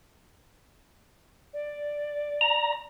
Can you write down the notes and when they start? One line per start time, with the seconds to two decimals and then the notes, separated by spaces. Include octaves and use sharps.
1.53 D5
2.41 A#5